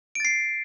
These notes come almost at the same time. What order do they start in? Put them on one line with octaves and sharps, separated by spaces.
D7 A6 C7